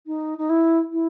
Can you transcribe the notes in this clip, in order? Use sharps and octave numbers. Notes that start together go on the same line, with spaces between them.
D#4
D#4
E4
E4